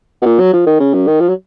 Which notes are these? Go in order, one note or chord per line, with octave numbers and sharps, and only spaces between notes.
B2
A#2
F#3
F3
D#3
C#3
F#2
D#3
F3
F#3